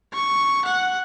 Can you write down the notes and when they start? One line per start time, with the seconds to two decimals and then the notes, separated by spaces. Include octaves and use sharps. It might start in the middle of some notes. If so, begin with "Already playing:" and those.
0.13 C#6
0.65 F#5